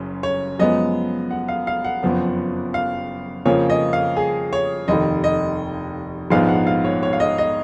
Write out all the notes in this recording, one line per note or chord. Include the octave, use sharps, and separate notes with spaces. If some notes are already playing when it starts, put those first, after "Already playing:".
Already playing: F#1 F#2 C#3 C#4
C#5
F#2 F3 G#3 B3 D#5
F#5
F5
F5
F#5
F#1 F2 F3 B3
F5
F2 C#3 F3 A#3 C#4 C#5
D#5
F5
G#4
C#5
F1 D#2 D#3 D#5
D#5
A#1 G#2 F3 G#3 B3 F5
F#5
F5
C#5
C#5
F5
D#5
D#5